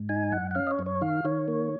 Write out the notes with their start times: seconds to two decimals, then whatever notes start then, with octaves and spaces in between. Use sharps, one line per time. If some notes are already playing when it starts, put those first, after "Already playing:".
Already playing: G#2
0.09 D#4 G#5
0.32 F#2 F#5
0.51 F#5
0.55 C#4 F5
0.67 D#5
0.71 C#5
0.79 F#2
0.86 C#5
1.01 D#3 F5
1.25 D#3 C#5
1.48 A#3